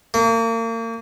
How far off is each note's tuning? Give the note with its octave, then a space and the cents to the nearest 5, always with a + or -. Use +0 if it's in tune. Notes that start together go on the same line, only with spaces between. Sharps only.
A#3 -35